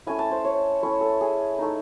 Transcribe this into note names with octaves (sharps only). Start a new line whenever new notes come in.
A3 C#4 E4 G#5
A5
C5
C#5
A3 C#4 E4 C#5
A4
G#4
A3 D#4